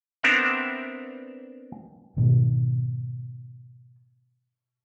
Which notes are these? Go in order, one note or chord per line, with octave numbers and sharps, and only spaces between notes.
B3 C4 D4 A#4 E5 F#5
G#2 B2 D#3 B3